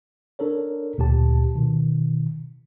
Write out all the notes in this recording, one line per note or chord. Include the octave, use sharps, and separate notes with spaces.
D4 A4 A#4 C#5
D2 A#2 G4 A5
B2 D#3